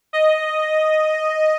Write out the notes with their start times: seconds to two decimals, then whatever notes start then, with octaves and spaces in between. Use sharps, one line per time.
0.13 D#5